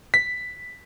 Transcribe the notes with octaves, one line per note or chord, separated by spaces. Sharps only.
B6